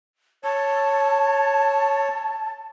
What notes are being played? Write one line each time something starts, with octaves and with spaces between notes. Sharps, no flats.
C#5 A5